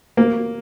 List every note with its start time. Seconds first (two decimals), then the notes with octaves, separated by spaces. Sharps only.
0.17 A#3